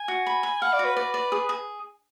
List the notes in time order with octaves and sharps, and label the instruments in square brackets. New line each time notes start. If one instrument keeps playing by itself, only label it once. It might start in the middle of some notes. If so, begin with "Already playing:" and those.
Already playing: [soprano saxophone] G#5
[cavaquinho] F#4
B5
B5
[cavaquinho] F5 [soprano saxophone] F#5
[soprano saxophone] D5
[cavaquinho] F#4
[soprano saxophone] B4
[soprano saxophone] B4 [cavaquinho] D5
[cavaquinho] D5
G#4
G#4